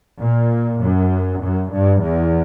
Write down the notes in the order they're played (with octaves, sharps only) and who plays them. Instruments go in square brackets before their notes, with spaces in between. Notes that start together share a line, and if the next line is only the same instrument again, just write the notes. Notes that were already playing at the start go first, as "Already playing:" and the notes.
[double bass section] A#2
F#2
F#2
G2
E2